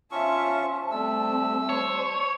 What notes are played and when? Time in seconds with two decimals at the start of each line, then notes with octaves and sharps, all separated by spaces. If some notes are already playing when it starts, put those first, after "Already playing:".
0.11 C#4 F4 C5 E5 A5 C#6
0.91 G3 A3 C4 E6
1.69 C5 C#5